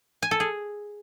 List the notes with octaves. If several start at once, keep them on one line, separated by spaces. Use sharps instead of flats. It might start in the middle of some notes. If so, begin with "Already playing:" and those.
G#5
A4
G#4